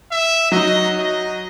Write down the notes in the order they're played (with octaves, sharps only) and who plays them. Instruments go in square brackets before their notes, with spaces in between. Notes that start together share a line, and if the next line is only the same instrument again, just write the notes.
[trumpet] E5
[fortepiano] F#3 D#4 [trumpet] D#5
[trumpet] D#5